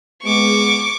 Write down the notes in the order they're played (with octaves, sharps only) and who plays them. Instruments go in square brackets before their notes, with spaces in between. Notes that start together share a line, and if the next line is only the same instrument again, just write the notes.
[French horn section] G#3 B3 G#4 [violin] C#6 D6